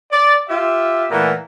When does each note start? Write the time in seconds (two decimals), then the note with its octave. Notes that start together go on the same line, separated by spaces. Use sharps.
0.12 D5
0.49 F4 G4 E5
1.11 A#2 E3 A3 B3 A#4